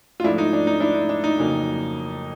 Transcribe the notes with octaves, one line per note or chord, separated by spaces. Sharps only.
F4
G#2 F3 A3 D4 E4
D#4
D4
D#4
D4 E4
D#4
D4
D#4
F2 C#3 F#3 A#3